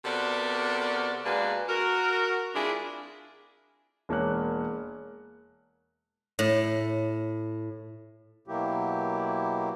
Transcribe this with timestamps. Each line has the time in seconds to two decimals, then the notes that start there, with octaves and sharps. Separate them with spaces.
0.05 C3 B3 F#4 A4 A#4 D5
1.25 B2 G#3 A#3 D4 F#4 B4
1.69 F#4 A#4
2.56 G#3 C4 D4 E4 F4 G#4
4.09 E1 A#3 C#5 F#6
6.39 A2
8.48 B2 F#3 A#3 E4 G4